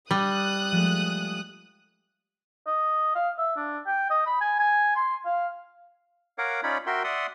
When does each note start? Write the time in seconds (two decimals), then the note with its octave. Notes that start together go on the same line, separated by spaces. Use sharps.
0.11 G3 D#6 F#6
0.72 F3 G#3 A3
2.67 D#5
3.15 F5
3.39 E5
3.57 D4
3.87 G5
4.10 D#5
4.26 B5
4.41 G#5
4.59 G#5
4.96 C6
5.26 F5
6.38 A#4 C#5 F5 F#5 D6
6.63 C#4 D#4 F4 C#5 D5 B5
6.87 F#4 A#4 E5 G5 C6
7.04 D5 E5 F#5 C6 D#6